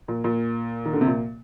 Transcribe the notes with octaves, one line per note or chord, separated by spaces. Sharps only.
A#2
A#2
D#3
D3
C3
A#2